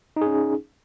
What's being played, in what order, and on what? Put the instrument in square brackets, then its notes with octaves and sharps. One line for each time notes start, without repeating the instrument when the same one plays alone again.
[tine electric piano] D#4
G#4
C#4